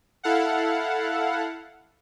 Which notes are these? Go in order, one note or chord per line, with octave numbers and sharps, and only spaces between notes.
E4 A4 F5 F#5